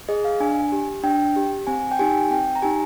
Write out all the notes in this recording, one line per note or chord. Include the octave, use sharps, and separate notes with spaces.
G#4 D#5
F5
D4 G#5
G4
D4 G5
G4
C4 G#5
G5
D#4 G4 G#5
C4 G5
A#5
D#4 G4 G#5